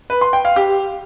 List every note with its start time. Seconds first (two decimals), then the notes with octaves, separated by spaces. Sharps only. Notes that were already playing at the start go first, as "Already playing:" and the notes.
0.10 B4
0.21 C6
0.33 G5
0.45 F5
0.56 G4